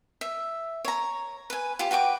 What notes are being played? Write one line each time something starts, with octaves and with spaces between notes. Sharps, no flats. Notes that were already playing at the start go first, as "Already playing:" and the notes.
E5
C#5 A#5
B4 G#5
F4 G4
F#4 B4 G5 D6